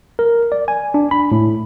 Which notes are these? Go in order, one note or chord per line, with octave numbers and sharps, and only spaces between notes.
A#4
D5
G#5
D4
B5
A2